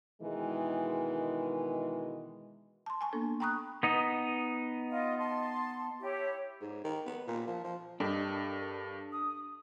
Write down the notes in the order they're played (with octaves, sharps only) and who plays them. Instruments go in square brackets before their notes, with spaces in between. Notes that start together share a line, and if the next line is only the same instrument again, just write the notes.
[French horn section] B2 D#3 E3 G#3
[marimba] A5 C6
G#5 A5 C#6
A#3 B3 D4 A4
G5 A#5 B5 C#6 D#6 F#6
[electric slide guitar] B3 D#4
[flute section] F4 D#5
A5 C6
E4 G4 C#5
[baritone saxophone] G#2
D#3
B3
A#2
F3
F3
[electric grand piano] G2 [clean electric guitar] D4 A4 [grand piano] G4 D#5 [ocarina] A#4
[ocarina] D#6